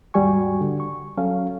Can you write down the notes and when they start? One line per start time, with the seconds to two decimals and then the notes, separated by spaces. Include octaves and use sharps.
0.14 D#2 G#2 G3 F#4 G#5 C#6
0.61 D3
0.80 C#6
1.17 F#3 C#4 A4 F5